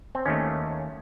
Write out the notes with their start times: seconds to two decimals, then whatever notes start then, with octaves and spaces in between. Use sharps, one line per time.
0.15 C4
0.26 D#2 D#3 A3 C#4